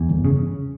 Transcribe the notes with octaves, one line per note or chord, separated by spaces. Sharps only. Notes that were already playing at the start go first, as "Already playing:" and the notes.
Already playing: E2
G1
C#3